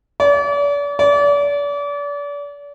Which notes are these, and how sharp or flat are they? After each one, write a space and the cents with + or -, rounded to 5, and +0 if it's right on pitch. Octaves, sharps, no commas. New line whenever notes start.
D5 -40
D5 -35